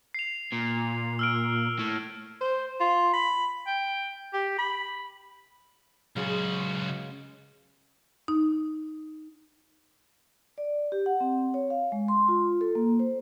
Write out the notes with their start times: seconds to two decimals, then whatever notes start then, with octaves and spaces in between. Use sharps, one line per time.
0.14 C7 F7
0.52 A#2
1.19 E6 F6 D7
1.79 A2
2.41 C5
2.80 F4
3.13 B5
3.67 G5
4.33 G4
4.58 B5
6.16 C#2 C#3 F#3 G#3 F#4
8.28 D#4
10.58 D5
10.92 G4
11.06 F#5
11.21 C4
11.54 C#5
11.70 F5
11.92 G#3
12.08 C6
12.28 F4
12.61 A4
12.75 A#3
12.99 C5